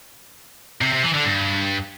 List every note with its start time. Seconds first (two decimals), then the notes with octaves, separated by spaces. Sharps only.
0.81 C3
0.92 C3
1.03 E3
1.14 D3
1.25 G2